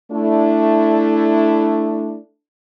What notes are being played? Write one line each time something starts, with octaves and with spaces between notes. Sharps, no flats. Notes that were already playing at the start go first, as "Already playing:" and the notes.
A3 D4 E4